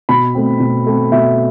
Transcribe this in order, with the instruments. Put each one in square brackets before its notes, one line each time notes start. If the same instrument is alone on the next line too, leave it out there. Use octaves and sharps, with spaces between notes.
[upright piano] B2 B5
A3 C4
B2
A3 C4
B2 E5